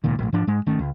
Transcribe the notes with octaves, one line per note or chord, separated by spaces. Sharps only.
E1 C#2 A#2 D#3
A#1 A2
G#2 F3 D4
G#2 G#3
G#1 D#3 A3 C#4
C#2